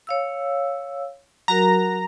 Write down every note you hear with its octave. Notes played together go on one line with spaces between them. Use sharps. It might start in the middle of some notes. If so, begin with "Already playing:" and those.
C#5 F5 E6
F#3 F#4 A#4 A#5